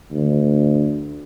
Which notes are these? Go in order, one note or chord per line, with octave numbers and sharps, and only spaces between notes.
D2